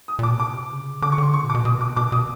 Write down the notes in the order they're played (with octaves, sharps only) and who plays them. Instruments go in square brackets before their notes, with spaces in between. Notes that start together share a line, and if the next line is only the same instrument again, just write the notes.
[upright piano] D#6
[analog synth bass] A#2
[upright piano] D6
[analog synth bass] B2
[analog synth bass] C3 [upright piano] D6
[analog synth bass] C#3
[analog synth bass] D3 [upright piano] D6
[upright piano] C#6
[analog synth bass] D3 [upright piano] C6
[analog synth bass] C#3 [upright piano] C#6
[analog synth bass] A#2
[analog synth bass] B2 [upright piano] D6
[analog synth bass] B2 [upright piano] D#6
[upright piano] D6
[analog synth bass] B2 [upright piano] D6
[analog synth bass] B2 [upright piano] D#6